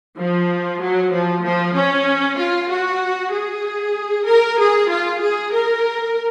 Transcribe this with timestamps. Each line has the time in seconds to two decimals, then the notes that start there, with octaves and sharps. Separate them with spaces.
0.18 F3
0.81 F#3
1.13 F3
1.43 F3
1.75 C#4
2.38 F4
2.70 F#4
3.32 G#4
4.27 A#4
4.58 G#4
4.90 F4
5.21 G#4
5.52 A#4